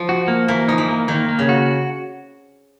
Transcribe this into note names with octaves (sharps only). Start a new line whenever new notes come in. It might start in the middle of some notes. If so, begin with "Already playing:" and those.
Already playing: F3
F#4
A#3
E3 A#3
F3 D#4
E3
A#3
D#3 A#3
A#3
C#3
F#4